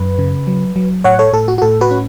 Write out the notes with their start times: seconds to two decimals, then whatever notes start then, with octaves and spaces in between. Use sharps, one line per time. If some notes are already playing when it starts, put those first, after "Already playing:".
Already playing: F#2 B4
0.19 C#3
0.47 F#3
0.76 F#3
1.04 A2 C#5 F#5
1.19 A4 C#5
1.33 A2 A4
1.48 F#4
1.58 F#4
1.62 A2 A4
1.81 F#4 B4
1.91 C#4